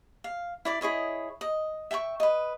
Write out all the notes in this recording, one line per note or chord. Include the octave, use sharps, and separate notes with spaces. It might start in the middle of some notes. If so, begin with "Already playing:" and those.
F5
E4 D5 D6
E4 G#4 C#5 D#5
D#5
E5 G5 G#5 C#6
B4 D#5